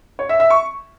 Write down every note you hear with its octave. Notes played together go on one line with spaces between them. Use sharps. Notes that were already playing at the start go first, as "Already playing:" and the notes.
C#5
E5
E5
C#6